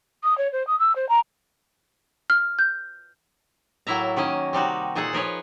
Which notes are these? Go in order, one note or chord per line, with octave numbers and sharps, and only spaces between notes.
D#6
C#5
C5
D#6
E6
C5
A#5
F6
G6
A2 F#3 A#3 E4 E5 A#5
D#3 A#3 C#4 D#5
C3 G3 D#4 F#4
A#2 D#4 G#4 A4 F#5
F3 A#4 B4 C#5